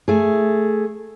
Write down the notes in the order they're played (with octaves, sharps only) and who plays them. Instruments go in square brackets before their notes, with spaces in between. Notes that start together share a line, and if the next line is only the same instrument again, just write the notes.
[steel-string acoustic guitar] A3 G#4